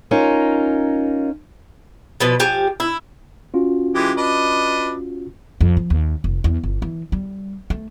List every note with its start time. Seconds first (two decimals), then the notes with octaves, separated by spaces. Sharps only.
0.11 C#4 D#4 F4 A#4
2.20 B2 F3 B4
2.40 F3 G4 G#5
2.80 E4
3.54 C#4 F4 F#4
3.95 E3 G#3 G4
4.17 D4 B4 D#5
5.61 F2
5.77 F3
5.90 D#2
6.24 F1
6.44 E2
6.63 G1
6.82 E3
7.12 G3
7.70 A3